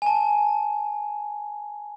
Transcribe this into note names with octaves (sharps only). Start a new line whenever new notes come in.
G#5 A5